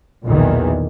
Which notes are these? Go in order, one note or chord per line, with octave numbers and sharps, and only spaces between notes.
B1 E2 A#2 D#3 E3